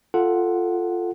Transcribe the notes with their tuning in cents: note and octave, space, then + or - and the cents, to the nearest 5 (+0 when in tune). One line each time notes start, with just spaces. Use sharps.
F4 +0 A4 +0 F#5 +0